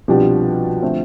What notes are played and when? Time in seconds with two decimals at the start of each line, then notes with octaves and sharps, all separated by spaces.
0.08 C2 B2 F3 G3 D4 G4
0.82 D3 A3 C4